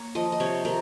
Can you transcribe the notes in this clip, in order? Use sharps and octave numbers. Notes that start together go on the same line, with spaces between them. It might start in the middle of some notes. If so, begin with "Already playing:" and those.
Already playing: A#3 C#5
F3 D#5
D#5
C3 C#5
C3 A#4